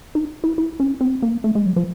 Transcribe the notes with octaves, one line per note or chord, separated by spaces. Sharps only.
D#4
E4
E4
C#4
C4
A#3
A3
G#3
F#3
F3